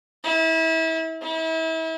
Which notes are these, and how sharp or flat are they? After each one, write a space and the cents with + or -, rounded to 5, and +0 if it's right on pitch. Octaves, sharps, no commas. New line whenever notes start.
E4 -30
E4 -35